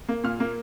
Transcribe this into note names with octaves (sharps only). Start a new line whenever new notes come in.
A#3
A#2 F6
A#3